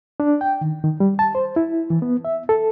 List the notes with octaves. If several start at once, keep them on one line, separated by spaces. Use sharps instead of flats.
D4
G5
D#3
D#3
G3
A5
C5
E4
E3
B3
E5
A4